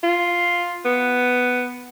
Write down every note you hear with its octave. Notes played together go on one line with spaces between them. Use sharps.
F4
B3